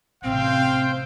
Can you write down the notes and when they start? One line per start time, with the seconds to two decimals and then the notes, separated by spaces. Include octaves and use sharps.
0.24 A1 C3 C4 C5 F5 G5